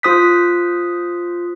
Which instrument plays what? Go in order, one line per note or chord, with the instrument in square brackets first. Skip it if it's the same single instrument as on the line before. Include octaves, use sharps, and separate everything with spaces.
[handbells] F4 C5 D#6 F#6 B6